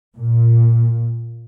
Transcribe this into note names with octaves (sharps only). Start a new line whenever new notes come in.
A#2